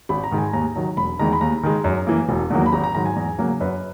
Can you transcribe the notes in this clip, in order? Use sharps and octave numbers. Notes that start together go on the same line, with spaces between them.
G#1 B5
A#5
G#2 D#3 G#3
G#5
D#2 A#5
D#3 F#3
E1 B5
E2 D#3 G#3 A#5
B5
D#2 A#5
D#3 G#3
F#2
E3 A#3
E1
E2 D#3 F#3 A#3
B5
G#1 A#5
A#5
G#2 D#3 F#3 A#5
G#5
E2
C#3 F#3 A#3
F#2 B4